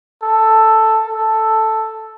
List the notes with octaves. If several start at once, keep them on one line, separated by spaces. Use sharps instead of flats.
A4
A4